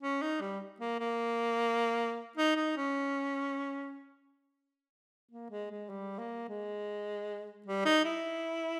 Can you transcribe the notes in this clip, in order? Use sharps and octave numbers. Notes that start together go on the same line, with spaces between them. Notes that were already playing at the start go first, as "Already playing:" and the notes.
C#4
D#4
G3
A#3
A#3
D#4
D#4
C#4
A#3
G#3
G#3
G3
A#3
G#3
G3
D#4
E4